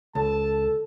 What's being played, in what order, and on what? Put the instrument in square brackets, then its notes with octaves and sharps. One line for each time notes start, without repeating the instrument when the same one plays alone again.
[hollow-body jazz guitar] C#2 [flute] A4 [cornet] A5